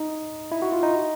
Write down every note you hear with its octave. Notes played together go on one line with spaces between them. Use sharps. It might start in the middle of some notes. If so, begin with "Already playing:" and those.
Already playing: D#4
E4
F#4
F4
D#4